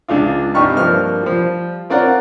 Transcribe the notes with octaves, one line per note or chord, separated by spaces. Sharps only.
C#2 D4 F4
C2 G2 D#4 G4 C#6 F6
G2 F3 A#3 F6
F3 G3
C4 F4 A#4 C#5 D5 F#5